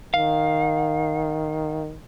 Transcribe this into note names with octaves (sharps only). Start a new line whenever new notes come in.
D#3 F5